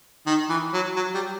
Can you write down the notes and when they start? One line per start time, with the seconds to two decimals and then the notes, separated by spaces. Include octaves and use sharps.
0.27 D#3
0.49 E3
0.74 F#3
0.96 F#3
1.14 G3